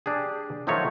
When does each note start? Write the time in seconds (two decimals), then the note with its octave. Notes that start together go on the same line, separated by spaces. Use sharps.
0.06 D4 G4 G#4
0.67 D#3 F3 F#3 A3 D#4 C#5